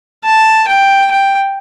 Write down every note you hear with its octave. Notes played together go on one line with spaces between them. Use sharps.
A5
G5
G5